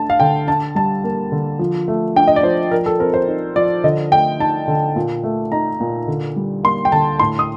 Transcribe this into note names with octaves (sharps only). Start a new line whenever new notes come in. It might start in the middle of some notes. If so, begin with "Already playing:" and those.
Already playing: A3 D4 A5
F5
D3 G5
D4 A5
G3 A5
A#3
D3
F3
A3
D4 G5
D#5
D5
F3 C5
F3 A#4
A4
C4 A#4
C5
D#4
F3 D5
D3 D#5
A3 G5
D#4 A5
D3
A#2
A3
D#4 A#5
A#2
D3
G3
A#3 C6
G5
D3 A5
A2 C6
D#6